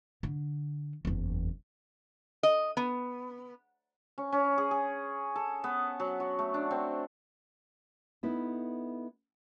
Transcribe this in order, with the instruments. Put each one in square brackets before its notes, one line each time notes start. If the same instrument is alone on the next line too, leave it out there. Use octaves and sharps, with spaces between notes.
[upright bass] D3
F#1 E2
[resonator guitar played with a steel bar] D#5
B3
[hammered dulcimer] C#4
C#4
G#4
G#4
A4
B3
F#3
F#4
A3
D4
C4
[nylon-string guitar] B3 D#4 E4 A4